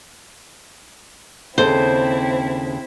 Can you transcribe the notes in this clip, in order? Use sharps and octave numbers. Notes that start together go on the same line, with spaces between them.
D#2 C#3 C4 E4 A4 C5